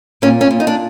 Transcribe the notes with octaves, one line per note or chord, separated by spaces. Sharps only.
A#2 C#4
C#4
A#2
D#4
D4